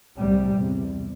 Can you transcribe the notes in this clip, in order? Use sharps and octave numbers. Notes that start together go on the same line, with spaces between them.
C2 C3 G3
E2 C3